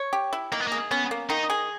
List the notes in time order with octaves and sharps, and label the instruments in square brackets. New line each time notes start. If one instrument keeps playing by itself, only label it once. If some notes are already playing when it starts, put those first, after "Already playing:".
Already playing: [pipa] C#5
G4
E4
[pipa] D#3 [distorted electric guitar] A#3
[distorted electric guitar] B3
A#3
[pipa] G#4
[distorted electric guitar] B3 [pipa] C#4
[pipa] A#3
[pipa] D#3 [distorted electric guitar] D#4
[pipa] G#4